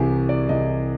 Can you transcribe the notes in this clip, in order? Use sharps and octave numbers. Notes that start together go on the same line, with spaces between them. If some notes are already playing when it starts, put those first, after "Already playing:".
Already playing: C2 C3 E3 G4 G#4
D5
C2 C3 E3 D#5